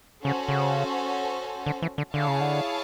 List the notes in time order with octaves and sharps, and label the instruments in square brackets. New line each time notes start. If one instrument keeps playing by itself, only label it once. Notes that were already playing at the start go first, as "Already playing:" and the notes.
[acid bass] C#3 [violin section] C#4 F#4 A4 C5
[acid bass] C#3
D3
E3
D3
[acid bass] D3 [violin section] E4 G#4 C#5 F5 A5
[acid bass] C#3
D3